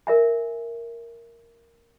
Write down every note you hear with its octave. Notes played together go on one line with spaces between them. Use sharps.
A#4 E5 G#5